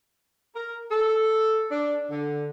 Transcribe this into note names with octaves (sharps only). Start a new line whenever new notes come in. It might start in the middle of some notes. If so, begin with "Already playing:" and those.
A#4
A4
D4
D3